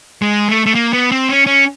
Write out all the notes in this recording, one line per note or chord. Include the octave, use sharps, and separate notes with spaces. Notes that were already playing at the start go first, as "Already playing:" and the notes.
G#3
A3
A3
A#3
B3
C4
C#4
C#4